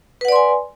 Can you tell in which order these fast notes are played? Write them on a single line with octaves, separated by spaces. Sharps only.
B4 F#5 D5 C6 G#5